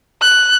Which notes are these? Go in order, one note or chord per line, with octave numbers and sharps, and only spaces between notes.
F#6